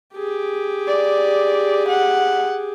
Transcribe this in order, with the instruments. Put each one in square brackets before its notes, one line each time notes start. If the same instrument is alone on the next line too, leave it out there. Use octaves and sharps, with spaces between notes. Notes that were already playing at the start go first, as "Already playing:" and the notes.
[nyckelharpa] G4 G#4
[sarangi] D5
F#5